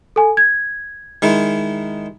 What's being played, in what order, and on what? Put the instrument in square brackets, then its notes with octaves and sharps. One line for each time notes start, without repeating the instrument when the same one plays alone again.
[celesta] A4 G#5
G#6
[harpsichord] D#3 G#3 E4